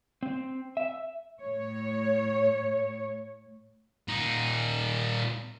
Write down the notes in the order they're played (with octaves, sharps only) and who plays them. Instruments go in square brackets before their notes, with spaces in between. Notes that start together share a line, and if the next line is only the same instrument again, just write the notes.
[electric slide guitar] C4
E5
[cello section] A2 C#5
[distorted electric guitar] A#2 D#4